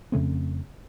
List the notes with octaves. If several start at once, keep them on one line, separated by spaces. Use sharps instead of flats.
F2 C#3 A3 C4